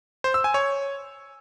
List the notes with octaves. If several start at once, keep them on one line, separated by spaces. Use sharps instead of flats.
C5
E6
G#5
C#5